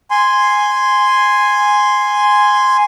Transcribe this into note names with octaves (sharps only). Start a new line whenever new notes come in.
G#5 C6